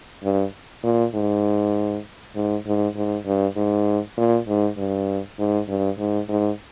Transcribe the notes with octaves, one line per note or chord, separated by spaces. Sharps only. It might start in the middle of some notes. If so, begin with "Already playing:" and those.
G2
A#2
G#2
G#2
G#2
G#2
G2
G#2
A#2
G#2
G2
G#2
G2
G#2
G#2